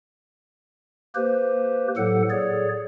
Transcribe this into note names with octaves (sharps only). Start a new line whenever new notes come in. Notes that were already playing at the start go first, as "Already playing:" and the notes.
A#3 G4 B4 C5
A2 F#3 A4 F#5
G#4 C#5 D5